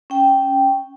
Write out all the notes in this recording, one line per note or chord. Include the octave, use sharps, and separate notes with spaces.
C#4 G5